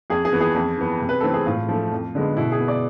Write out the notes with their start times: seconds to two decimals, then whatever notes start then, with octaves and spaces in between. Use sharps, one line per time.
0.10 F2 G#4
0.25 G#4
0.33 E3 B3
0.41 G#4
0.55 F2
0.78 E3 B3
1.01 C3
1.09 B4
1.21 E3 A3 C4 A4
1.34 G#4
1.46 A2 F4
1.69 F3 A3
1.92 F2
2.15 D3 G#3 B3
2.37 B2 E4
2.52 G#4
2.60 B3
2.68 D5